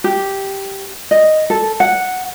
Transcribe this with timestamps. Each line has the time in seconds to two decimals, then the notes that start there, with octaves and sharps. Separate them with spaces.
0.04 G4
1.11 D#5
1.50 A4
1.80 F#5